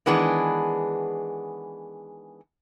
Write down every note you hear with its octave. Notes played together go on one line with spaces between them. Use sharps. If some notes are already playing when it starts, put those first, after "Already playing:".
D#3 E3 G#3 B3 D4 G#4